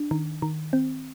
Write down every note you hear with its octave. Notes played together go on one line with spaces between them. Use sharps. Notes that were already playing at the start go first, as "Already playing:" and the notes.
Already playing: D4
D#3
D#3
C4